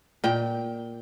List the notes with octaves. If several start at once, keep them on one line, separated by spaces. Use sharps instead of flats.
A#2 G5